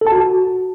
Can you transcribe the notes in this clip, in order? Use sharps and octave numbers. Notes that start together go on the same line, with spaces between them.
A4
A5
F#4